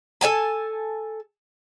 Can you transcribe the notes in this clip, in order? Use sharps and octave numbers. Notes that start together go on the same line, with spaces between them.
A4 D5 G#5 A5